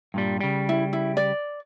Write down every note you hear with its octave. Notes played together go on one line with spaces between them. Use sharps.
G2 A#2 G3
C#3 G3
E4
E4
D5